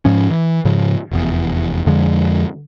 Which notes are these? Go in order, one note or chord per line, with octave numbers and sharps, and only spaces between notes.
G#2 F3 C#4
E3
G#2 C#3 F3
F1 E2
F2 D3 F3 G#3